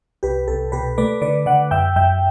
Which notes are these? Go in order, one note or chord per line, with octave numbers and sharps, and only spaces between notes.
C2 G4 B4
C2 A4
B2 G4 B4
A3 B4 D5
D3 B4 D5
D3 D5 F#5
F#2 E5 G5
F#2 E5 G5